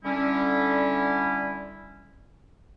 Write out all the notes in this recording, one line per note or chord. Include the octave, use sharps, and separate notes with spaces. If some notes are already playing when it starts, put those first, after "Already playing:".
D3 G3 C#4 E4